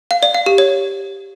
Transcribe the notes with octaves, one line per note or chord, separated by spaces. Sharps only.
F5
D5
F5
G4
C#5